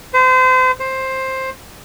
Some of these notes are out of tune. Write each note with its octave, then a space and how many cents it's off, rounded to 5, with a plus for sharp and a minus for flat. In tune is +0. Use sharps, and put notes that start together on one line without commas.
C5 -35
C5 +10